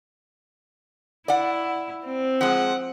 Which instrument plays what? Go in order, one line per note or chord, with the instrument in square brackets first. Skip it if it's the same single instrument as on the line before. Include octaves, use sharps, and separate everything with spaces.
[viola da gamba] E4 [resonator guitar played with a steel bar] D5 F#5
[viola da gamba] C4
[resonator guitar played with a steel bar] F3 G#3 [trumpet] F#5